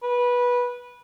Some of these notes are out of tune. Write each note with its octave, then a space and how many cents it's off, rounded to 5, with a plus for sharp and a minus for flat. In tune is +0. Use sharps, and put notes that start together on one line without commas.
B4 -15